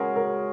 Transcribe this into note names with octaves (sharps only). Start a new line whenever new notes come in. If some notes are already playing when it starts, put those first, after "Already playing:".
Already playing: C#3 G#3 C#4 F#4 G#4 A#4
A#4